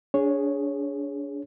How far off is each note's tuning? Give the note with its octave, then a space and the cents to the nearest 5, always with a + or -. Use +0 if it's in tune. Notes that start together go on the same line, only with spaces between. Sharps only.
D4 -30 G#4 +0 C#5 -5